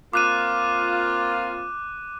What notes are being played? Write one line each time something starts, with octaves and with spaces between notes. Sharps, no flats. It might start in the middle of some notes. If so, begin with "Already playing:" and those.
A#3 C4 F4 D6 F#6 D#7